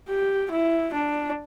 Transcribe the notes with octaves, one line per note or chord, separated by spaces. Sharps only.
G4
E4
D4